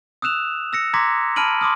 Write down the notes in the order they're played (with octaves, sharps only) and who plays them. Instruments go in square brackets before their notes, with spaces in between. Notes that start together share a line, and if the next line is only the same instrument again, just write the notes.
[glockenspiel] D#6 E6 F#6 E7 F7
E6 A#6 C#7
A#5 C6 D6 G#6 A#6 B6
A5 B5 F6 D7 D#7 F#7
C6 D6 D#6 F6